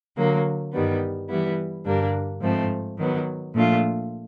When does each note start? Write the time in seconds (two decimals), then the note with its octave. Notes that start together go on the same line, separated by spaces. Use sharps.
0.17 D3 F#3 A#3
0.72 G2 D#3 G3 B3
1.29 E3 G3 B3 E4
1.85 G2 D3 G3 A#3 D4
2.41 G#2 F3 A3 C4
2.98 D#3 F#3 B3
3.54 A#2 F3 A3 D4 F4